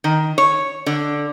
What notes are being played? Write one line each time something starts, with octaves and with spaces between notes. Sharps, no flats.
D#3
C#5
D3